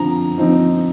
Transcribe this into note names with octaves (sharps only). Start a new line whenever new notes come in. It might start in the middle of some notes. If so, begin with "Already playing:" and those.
Already playing: D3 F3 C4 A#5
F3 C4 D#4